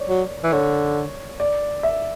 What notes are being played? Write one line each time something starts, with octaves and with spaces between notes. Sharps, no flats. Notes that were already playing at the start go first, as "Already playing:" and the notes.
Already playing: C#5 D5
F#3
E3
D3 C#5
D5
E5